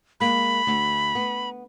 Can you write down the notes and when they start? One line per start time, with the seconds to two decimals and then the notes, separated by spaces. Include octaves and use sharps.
0.20 G#3 A#3 B5
0.67 D2
1.15 B3